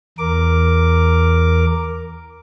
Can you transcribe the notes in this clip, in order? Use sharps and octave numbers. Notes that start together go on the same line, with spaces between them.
E2 A#4 D6